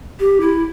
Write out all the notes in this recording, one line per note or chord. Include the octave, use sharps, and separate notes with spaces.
G4
E4